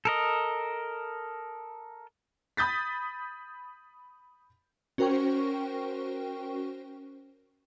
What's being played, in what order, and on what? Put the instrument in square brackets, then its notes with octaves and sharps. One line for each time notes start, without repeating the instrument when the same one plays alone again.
[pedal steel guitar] A4 A#4 D#5
[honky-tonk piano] B5 D#6 G6 A6 B6
[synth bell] C#4 F#4 A#4 C5 G5 C#6